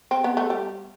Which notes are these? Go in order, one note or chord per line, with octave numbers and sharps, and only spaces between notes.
C4
B3
A3
G3